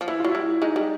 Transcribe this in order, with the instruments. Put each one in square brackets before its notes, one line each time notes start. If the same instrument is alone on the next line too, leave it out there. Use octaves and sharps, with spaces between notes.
[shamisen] F3
[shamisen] E3 [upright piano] E4
[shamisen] F#3 [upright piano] F4
[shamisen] G3 [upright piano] E4
[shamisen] G#3 [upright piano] D#4
[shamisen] G3